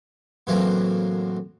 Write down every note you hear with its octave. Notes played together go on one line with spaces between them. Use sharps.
F#2 A2 E3 F#3 A#3 C4